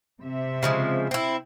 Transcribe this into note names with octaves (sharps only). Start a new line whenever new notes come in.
C3 E5
C#3 F3 G#3
C4 E4